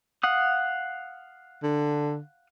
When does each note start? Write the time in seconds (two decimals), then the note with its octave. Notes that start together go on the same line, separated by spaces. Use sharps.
0.23 F5 F#5 D#6
1.63 D3